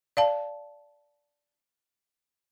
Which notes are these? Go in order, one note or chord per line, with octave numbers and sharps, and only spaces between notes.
D5 F5 A5